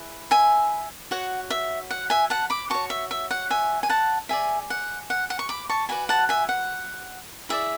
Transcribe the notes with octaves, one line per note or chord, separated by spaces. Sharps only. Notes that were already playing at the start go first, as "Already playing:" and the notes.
Already playing: E4 G#4 B4
E5 G#5
F#4 C#5 F#5
E5
F#5
E5 G#5
F#5 A5
B5 D6
F#4 C#5 A5 C#6
E5
E5
F#5
E5 G#5
G#5
F#5 A5
G#4 D5 E5 G#5
F#5
F#5
F#5
C#6
B5 D6
A5 C#6
F#4 B4 D5 G#5 B5
F#5 A5
E5 G#5
F#5
E4 G#4 D5 E5